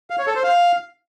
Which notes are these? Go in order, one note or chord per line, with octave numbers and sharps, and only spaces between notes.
F5
C#5
A4
C5
F5